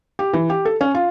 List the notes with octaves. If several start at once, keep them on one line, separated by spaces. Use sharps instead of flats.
G4
E3
G4
A4
C#4
F4